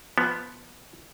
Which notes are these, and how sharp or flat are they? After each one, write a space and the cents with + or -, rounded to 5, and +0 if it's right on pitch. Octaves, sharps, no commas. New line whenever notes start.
F3 +0 B3 +0